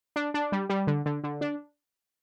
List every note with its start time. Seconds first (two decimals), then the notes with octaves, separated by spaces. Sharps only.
0.16 D4
0.34 D4
0.52 G3
0.70 G3
0.87 D3
1.06 D3
1.24 D3
1.41 D4